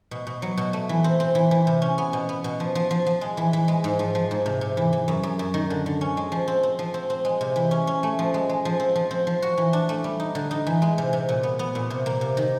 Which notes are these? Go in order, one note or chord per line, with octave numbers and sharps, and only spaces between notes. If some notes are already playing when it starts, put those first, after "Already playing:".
B2
B2
F#3
B2
A3
E3
C4
C4
E3
E3
C3
C#4
B3
B2
B3
B2
F3
F3
F3
F3
G#3
E3
E3
G#3
G#2
F3
F3
G#2
C3
C3
E3
E3
F#2
F#2
F#2
D#3
D3
D3
C#4
G#3
F3
C4
C4
F3
C4
C4
G#3
C3
E3
C#4
C#4
A3
F3
G#3
G#3
F3
C4
F3
C4
F3
F#4
E3
D4
A3
G3
D#4
D3
D#4
E3
G#3
C3
C3
A#2
B3
B3
A#2
C3
A#3
C3
D#3